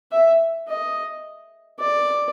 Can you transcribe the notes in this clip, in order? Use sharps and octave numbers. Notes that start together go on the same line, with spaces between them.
E5
D#5
D5